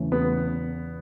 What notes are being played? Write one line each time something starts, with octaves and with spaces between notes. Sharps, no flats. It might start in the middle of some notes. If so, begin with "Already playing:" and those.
Already playing: E2 C#3 E3 A3 C#4
B3